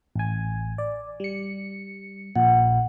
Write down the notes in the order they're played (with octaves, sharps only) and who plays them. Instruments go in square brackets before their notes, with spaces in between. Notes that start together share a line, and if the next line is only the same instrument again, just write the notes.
[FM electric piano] A1 G#5
D5
G3 C#7
[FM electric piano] A#1 A#2 [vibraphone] F#5